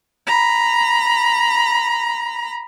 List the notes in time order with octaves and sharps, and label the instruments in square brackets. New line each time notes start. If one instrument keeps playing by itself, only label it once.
[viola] A#5 B5